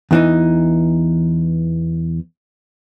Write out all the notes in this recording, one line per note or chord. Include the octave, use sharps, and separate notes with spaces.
E2 E3 D#4